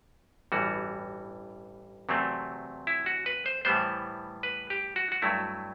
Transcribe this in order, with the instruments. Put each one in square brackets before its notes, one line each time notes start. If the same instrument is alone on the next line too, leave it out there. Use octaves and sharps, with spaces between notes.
[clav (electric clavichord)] A1 G2 E3 G3 F#4
E2 C3 F#3 A3 C4
E4
F#4
B4
C5
A2 E3 G3 B3 C5
B4
G4
F#4
F#4
G2 F#3 A3 E4